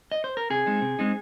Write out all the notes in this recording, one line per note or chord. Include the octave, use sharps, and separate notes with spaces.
D#5
C5
A#4
C3 G#4
G#3 C4 D#4
C3
G#3 C4 D#4